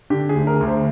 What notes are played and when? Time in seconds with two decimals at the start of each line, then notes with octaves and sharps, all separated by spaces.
0.10 D3 G4
0.29 G#4
0.35 D2
0.47 A#4
0.61 D2
0.67 C5